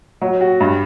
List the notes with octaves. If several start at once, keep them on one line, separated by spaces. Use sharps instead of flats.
F#3
F#4
G2